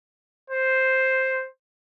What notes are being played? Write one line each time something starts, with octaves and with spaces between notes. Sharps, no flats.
C5